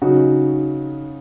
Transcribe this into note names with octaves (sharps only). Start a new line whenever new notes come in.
C#3 F#3 D#4 F#4